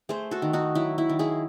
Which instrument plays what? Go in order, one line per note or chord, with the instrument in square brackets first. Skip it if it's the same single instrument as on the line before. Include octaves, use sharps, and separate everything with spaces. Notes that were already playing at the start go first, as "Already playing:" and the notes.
[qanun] A3 G#4 C5
F#4 A4
D#3
D#4 F#4
F#3 E4
E4
D#3
E4 G#4